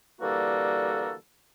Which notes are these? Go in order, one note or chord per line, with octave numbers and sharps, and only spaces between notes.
D3 E3 G3 A#3 F#4 A4